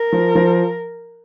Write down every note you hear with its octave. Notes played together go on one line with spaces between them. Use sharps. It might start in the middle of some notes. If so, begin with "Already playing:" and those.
Already playing: A#4
F3
F3